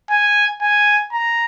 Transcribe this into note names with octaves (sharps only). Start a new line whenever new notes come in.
G#5
G#5
A#5